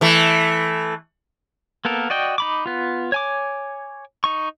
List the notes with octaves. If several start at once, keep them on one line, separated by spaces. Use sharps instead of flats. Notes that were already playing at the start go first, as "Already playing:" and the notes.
E3 A3
A#3 B3 A4 A#4
F#4 D5 D#5 G5
D#4 B5 D6
B3 F4
C#5 G#5 D6
D#4 C#6